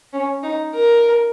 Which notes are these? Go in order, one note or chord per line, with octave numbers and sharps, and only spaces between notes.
C#4
D#4
A#4